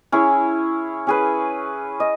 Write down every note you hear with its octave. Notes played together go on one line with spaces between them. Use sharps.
C#4 E4 G#4 C#5
C#4 G#4 B4
D#5